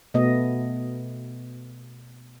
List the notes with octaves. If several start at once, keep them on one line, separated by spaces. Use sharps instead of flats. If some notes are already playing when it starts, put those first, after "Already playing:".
B2 A3 B3 D#5